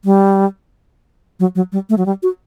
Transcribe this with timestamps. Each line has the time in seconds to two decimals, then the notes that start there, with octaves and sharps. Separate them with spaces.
0.05 G3
1.40 F#3
1.55 F#3
1.72 G3
1.89 A3
1.98 F#3
2.06 G3
2.23 F#4